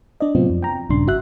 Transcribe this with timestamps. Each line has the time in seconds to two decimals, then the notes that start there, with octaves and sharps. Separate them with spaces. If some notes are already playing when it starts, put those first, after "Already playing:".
0.20 D4 D5 D#5
0.35 A2 C3 F#3 B3 C4 F4
0.50 F2
0.63 G5 A#5
0.89 A#1 G2 C#3 D4 C6
1.07 G#1 F#4 E5 F#6